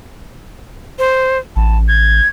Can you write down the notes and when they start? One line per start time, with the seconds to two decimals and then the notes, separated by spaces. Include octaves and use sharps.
0.99 C5
1.56 A1 A5
1.88 G#6